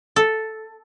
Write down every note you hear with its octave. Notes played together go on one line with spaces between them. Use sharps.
A4